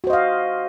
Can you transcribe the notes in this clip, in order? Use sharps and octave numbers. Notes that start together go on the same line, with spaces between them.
F#4 C5 D#5 F5